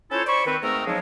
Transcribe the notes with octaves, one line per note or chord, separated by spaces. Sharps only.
C#4 E4 F4 A4 C5 C#5
C5 D5 B5 C#6
D#3 C4 B4
G#2 A3 C4 A#4 D#5 E6
C#3 F3 F#3 G#3 C#4 D#4